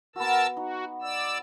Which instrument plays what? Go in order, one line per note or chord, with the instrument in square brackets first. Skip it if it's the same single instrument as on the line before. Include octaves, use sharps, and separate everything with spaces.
[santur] B3 F#4 [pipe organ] A#4 A5 E6
[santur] D#4 [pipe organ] F#4
[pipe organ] D5 E6